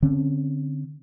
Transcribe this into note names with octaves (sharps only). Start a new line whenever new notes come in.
D3 C4 C#4